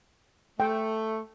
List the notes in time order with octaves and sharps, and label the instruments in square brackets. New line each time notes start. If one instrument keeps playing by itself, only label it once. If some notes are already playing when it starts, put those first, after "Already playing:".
[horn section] A3 [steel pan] G5